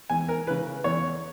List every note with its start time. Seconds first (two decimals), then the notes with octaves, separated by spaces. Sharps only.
0.10 E2 G#5
0.28 A#4
0.47 E3 B4
0.50 C#3
0.84 E2 C#5